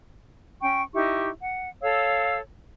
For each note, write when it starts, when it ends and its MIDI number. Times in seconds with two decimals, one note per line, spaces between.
0.61 0.82 61
0.61 0.82 79
0.61 0.82 85
0.94 1.28 63
0.94 1.28 64
0.94 1.28 67
0.94 1.28 85
1.41 1.67 78
1.82 2.38 69
1.82 2.38 73
1.82 2.38 77
1.82 2.38 88